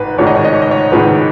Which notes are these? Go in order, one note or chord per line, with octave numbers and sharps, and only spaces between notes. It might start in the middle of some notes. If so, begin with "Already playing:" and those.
Already playing: G#1 G#2 B4
G#1 G#2 D#3 C#5
D#5
C#5
D#5
C#5
D#5
C#5
G#1 G#2 D#3 B4